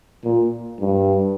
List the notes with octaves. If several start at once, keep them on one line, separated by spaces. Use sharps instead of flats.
A#2
G2